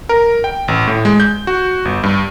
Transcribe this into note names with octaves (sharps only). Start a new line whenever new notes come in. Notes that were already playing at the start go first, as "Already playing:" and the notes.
A#4
G5
A1
A2
G#3
G6
F#4
G1
G2